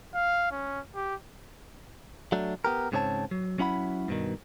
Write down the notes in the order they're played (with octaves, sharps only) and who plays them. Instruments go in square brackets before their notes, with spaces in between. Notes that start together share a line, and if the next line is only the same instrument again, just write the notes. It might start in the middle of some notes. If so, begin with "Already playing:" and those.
[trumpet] F5
C#4
G4
[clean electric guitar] F#3 A3 D4
B3 G4 A#4
G#2 C#3 B3 C4 C#5 A5
F#3
F#3 C#4 E4 F#5 B5
G2 B2 D#3